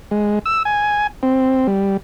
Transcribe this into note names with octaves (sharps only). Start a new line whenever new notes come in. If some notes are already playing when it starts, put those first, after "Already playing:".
G#3
E6
G#5
C4
G3